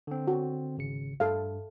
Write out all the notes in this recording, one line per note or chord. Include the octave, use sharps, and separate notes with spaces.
D3 C4
F#4
G#1 C#3 C#7
G2 A4 F5